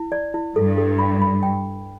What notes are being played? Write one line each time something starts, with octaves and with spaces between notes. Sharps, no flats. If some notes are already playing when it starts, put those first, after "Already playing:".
Already playing: E4
D5
E4
G2 A4
A4
B5
B5
G5